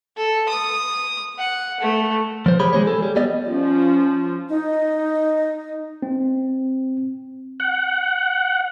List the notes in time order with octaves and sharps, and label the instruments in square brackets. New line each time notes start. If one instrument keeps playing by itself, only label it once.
[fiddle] A4
D#6
F#5
A3
[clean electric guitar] F3 C5
G4 G#4 C#5 B5
E3 G#3 B3 C4 C5 C#5
G#4 A4
G3
G3 B3 D5 D#5
[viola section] F3 [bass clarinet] C#4
[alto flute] D#4
[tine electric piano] C4
[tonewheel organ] F#5